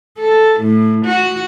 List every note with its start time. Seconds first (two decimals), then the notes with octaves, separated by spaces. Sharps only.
0.19 A4
0.60 A2
1.06 F#4